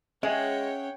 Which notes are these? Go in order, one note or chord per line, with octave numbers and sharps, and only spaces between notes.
G#3 C#4 G#4 C#5 E5 F#5 G5